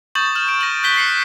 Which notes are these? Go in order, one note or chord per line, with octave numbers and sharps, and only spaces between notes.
C#6 D#6 G6 A6 E7 F#7
F6 E7 F#7
D7
A#6 D#7 F#7
F#6 G6 B6 G7
F#6 C7 C#7 F#7